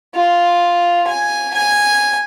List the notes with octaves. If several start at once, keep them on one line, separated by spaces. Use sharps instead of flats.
F4
G#5
G#5